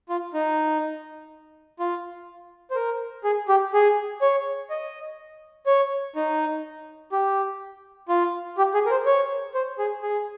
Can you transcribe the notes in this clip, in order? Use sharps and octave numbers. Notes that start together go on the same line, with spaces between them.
F4
D#4
F4
C5
A#4
G#4
G4
G#4
C#5
D#5
C#5
D#4
G4
F4
G4
G#4
A#4
C5
C#5
C5
G#4
G#4